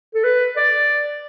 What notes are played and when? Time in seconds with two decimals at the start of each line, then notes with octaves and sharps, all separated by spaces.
0.14 A4
0.24 B4
0.57 D5